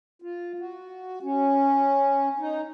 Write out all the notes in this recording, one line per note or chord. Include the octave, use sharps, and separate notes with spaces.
F4
F#4
C#4
D#4